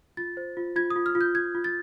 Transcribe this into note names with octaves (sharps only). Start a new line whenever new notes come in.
F4 A6
C5
F4
F4 G#6
D#6
F4
F6
F4
G6
F4 G#6
F4
A6